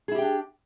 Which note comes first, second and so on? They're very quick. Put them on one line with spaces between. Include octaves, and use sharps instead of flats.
G#4 E4 G4 G5 D4